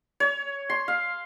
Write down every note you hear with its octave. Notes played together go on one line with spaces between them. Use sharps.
C#5
C6
F5